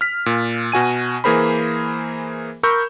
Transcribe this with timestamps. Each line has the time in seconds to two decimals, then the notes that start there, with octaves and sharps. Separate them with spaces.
0.01 F6 B6
0.26 A#2
0.72 B2 F#4 G#5 D#7
1.24 E3 A#3 G#4 A#4 C5 B5
2.63 A#4 B5 C#6 E6 G6